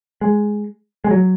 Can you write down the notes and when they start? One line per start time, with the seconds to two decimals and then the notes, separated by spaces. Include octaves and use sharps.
0.21 G#3
1.04 G#3
1.11 F#3